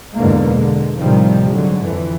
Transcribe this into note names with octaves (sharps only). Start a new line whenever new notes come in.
E2 G#2 B2 D3 G#3 A#3
D3 G#3
A2 C3 D#3 F3 G3
G#2 D3 F#3
F2 E3